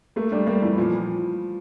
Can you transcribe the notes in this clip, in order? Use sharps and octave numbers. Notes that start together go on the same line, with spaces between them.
A3 A#3
G3 D4
G3 A#3
F2 E3
A#2 F3